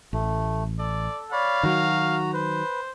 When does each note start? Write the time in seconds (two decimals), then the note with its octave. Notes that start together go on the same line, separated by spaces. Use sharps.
0.13 A1 A3
0.79 A4 D5
1.32 C#5 D5 F5 B5
1.63 D#3 F#3 F#4 A#5
2.34 B4 C5